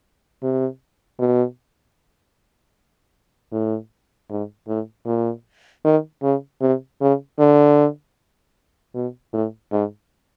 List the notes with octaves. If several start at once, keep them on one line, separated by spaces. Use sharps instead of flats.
C3
B2
A2
G#2
A2
A#2
D#3
C#3
C3
C#3
D3
B2
A2
G#2